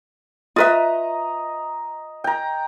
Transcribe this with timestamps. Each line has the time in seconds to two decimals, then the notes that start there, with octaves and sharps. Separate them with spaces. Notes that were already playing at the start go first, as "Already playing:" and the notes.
0.56 F4 B4 D#5 E5 A#5
2.24 G5 A#5